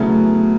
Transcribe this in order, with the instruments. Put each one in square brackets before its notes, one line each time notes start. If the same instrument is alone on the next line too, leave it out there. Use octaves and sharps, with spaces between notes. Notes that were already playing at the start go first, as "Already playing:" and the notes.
Already playing: [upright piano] C#3 F#3 B3 E4 [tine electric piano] A3